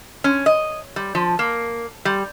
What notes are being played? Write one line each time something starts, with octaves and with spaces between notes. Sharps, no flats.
C#4
D#5
G3
F3
A#3
G3